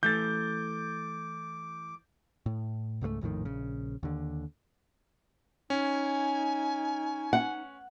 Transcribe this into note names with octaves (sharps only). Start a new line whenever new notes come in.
E3 A3 D6 G6 A6
A2
C#2 G#2 F#3 A3
A#1 F2 A2 D#3
A#1 C#3
D#2 D3
C#4 D#4 G#5
F#5